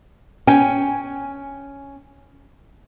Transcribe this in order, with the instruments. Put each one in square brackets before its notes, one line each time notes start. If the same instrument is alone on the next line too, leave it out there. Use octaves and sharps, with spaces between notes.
[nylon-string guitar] C#4 G5 G#5